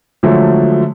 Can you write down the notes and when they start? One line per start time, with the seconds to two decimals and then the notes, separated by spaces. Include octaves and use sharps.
0.23 D3 F3 F#3 G#3 A3